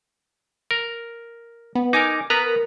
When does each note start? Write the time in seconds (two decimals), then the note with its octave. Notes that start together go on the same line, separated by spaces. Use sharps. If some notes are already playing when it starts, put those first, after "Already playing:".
0.71 A#4
1.75 B3
1.93 D#4 A#4 G#5 D6
2.30 B3 A#4 B4 A#5